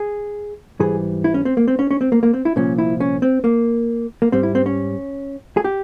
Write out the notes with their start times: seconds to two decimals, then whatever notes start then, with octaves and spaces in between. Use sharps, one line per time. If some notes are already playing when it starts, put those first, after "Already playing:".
Already playing: G#4
0.79 G#2 E3 G3 G#4
1.24 E4
1.34 C#4
1.45 C4
1.57 A#3
1.68 C4
1.79 C#4
1.91 C#4
2.01 C4
2.12 A#3
2.23 A#3
2.33 C4
2.45 E4
2.56 C2 A#2 F3 C#4
2.78 E4
3.00 C#4
3.22 C4
3.44 A#3
4.22 A#3
4.32 G#2 G3 C4
4.43 E4
4.55 C4
4.66 C#4
5.57 G#4
5.64 G4